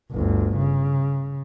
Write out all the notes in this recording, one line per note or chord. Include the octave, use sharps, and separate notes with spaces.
G1 D2
C#3